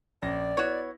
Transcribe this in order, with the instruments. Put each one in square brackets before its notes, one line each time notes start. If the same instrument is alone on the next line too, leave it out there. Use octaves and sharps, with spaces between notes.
[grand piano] A#1 C#4 A#6 [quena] D5
[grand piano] B3 E4 [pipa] F#4 C#5